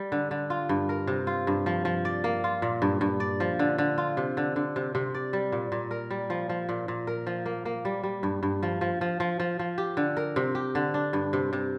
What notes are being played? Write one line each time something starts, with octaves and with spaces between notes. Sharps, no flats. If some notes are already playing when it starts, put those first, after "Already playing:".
Already playing: G3
D3
D3
F4
G2
A#4
C3
F4
G2
F3
F3
D5
A#3
F4
A#2
G2
G2
D5
F3
D3
D3
F4
C3
D3
D3
C3
C3
D5
G3
A#2
A#2
A#4
G3
F3
F3
A#2
A#2
A#4
F3
A#3
A#3
G3
G3
G2
G2
F3
F3
F3
F3
F3
F3
G4
D3
A#4
C3
G4
D3
D4
G2
C3
C3